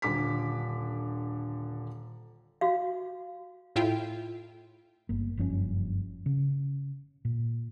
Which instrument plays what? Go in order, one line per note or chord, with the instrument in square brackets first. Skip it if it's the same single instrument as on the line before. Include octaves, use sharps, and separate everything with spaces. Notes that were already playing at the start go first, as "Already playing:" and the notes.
[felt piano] D#1 D3 D6 B6
[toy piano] F#4 F5
[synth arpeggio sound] A2 E4 F4 G5
[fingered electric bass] G1 A#3
F#1 G2 F3 C#4
C#3
A#2